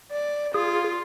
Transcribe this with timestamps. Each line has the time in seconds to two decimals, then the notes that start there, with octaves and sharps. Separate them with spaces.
0.12 D5
0.54 F4 G#4